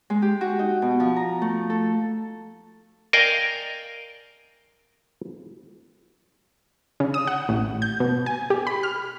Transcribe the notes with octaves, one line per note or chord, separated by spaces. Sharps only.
G#3
G4
F#4
D#4
B2
F3
A#5
A3
A4
A#4 D5 D#5 F5 G5 G#5
C#3
D#6
F#5
A1
G6
B2
G#5
G4
B5
F6